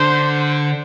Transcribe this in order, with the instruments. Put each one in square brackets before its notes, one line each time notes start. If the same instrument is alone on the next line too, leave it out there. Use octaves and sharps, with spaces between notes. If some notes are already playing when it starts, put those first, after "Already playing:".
Already playing: [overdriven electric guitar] D3 [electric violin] C5